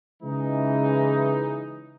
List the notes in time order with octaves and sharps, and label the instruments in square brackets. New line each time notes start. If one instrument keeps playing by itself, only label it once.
[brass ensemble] C#3 E3 G#3 D#4